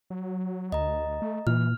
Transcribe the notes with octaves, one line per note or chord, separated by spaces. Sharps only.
F#3
D2 D#5 A#5
A3
A#2 E3 F6